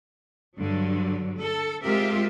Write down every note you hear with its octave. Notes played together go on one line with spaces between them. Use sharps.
G2 D3 F#3
A4
G#3 C4 F4 G4 A#4 E5